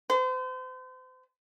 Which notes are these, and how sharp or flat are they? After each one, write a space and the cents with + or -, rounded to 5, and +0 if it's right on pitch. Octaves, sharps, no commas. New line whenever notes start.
C5 -40